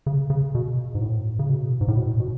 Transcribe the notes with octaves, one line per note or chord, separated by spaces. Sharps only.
C#3
C#3
B2
G#2
A2
C#3
B2
G#2
A2
B2
B2